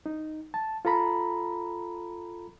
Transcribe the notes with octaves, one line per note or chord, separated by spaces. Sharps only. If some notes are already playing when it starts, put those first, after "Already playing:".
D#4
A5
F4 A4 A#5 B5